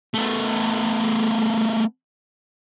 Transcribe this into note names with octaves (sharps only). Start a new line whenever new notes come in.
A3 B3